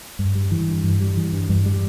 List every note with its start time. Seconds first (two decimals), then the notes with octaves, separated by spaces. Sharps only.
0.19 G2
0.35 G3
0.51 E3
0.68 G2
0.83 G2
1.01 G3
1.17 E3
1.33 G2
1.49 G2
1.66 G3